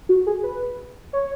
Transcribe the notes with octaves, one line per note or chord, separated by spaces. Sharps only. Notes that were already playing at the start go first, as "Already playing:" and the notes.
F#4
G#4
B4
C#5